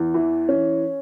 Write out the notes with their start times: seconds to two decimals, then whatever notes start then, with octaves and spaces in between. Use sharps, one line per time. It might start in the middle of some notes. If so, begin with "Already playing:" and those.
Already playing: E2
0.14 E3
0.49 C#4